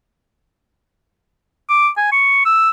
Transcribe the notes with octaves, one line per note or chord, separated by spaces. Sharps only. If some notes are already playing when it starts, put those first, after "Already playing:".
D6
G#5
C#6
E6